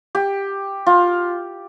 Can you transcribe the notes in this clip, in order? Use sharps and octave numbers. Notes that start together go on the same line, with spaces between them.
G4
F4